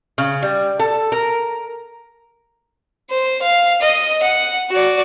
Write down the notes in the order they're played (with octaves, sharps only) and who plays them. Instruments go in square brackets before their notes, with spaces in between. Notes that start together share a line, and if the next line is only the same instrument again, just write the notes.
[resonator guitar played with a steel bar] C#3
G3
A4
A#4
[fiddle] C5
F5
D#5
F#5
F#4 D5